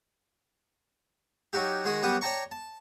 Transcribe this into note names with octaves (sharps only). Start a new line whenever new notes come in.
F#3 D#4 F#4 G4
D#3 G#3 F#4 D#5
F#2 G3 B3 F#4 G4 D#6
C#5 D5 G5 A5 A#5 C#6
A5